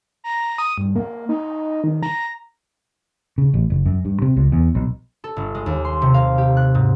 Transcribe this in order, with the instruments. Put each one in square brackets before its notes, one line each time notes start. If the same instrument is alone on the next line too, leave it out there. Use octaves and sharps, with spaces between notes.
[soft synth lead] A#5
D#6
G2
A#3
D#4
D#3
A#5
[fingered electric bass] C#3
A1
F#1
F#2
G2
C3
C#2
E2
B1
[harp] A4
G1
G#3
D#2
C6
C3
F5
G4
F#6
G#2